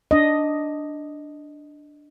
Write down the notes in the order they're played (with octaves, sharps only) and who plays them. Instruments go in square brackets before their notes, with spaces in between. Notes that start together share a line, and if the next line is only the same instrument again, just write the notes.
[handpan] D4 D#5